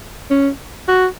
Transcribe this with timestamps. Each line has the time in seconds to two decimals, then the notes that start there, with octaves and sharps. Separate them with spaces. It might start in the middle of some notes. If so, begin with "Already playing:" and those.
0.31 C#4
0.88 F#4